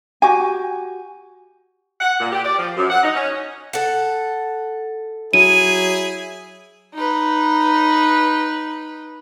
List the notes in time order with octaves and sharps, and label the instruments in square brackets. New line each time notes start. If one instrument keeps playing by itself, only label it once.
[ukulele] F#4 G4 G#5
[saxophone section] F#5
A#2
G4
D5
F3
F#2
F#5
D#4
C#4
[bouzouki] A4 F#5
[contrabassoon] F#3 [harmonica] E4 G#4 [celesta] D#7
[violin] D#4 B4